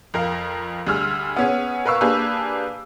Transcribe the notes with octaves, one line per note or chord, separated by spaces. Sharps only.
F2 A#4 F5
D2 G3 G#4 E6 F6
B3 C#4 G#4
A#4 B4 F5 C#6 E6
A#3 D4 G4 G#4 B4